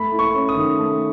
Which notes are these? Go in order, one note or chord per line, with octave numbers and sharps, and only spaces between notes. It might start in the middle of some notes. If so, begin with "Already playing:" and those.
Already playing: A3 B5
E4
C#6
C#4
D#6
D#3
A3